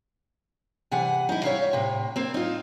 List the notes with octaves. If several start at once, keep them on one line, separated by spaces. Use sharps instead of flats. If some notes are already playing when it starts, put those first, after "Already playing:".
C3 E3 F#5 G#5
D#4 E4
C#5 E5 F5
A2 C3
A#3 C4
D#4 F4